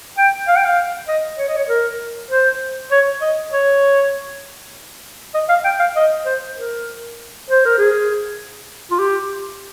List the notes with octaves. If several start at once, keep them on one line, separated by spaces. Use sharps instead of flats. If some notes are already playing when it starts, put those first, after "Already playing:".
G5
F5
G5
F5
D#5
C#5
D#5
C#5
A#4
C5
C#5
D#5
C#5
D#5
F5
G5
F5
D#5
C5
A#4
C5
A#4
G#4
F4
G4